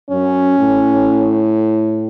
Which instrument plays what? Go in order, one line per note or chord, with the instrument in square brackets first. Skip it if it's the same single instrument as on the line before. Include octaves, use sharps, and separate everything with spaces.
[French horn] F#2 [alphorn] C#4
[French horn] A2